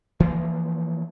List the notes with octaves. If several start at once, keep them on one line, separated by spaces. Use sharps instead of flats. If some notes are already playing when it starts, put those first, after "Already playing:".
E3 F3 G#3 A#3